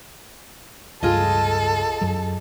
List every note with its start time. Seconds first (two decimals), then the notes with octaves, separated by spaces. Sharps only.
1.03 C#2 G2 F4 G#4 A4 D#5
2.01 F#2 F#3